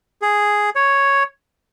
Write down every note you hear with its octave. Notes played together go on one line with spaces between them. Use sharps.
G#4
C#5